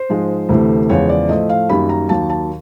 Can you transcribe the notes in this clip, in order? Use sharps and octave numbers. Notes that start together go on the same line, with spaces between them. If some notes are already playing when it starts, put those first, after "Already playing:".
Already playing: C5
G#2 F3 G#3
D2 C3 E3 A3
E2 C#3 F3 G#3 C#5
D5
A2 F3 A3 D#5
F5
F#2 D#3 G3 A#3 B5
A#5
D#2 D#3 F#3 A#3 A5
A5